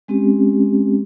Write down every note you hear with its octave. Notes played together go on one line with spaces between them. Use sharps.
G#3 C4 C#4 G4